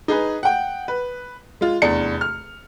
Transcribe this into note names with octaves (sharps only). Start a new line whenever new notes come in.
D#4 G#4 B4
F#5 G5
B4
G#3 F4
F1 E2 D4 C#7
F6